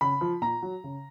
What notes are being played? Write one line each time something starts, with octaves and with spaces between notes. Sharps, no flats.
C#3 B5
F3
A#2 A#5
F#3
C#3